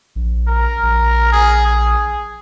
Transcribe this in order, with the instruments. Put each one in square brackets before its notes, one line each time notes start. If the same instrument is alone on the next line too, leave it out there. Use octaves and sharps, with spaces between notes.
[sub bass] A#1
[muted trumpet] A#4
[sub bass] A#1
[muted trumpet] G#4
G#4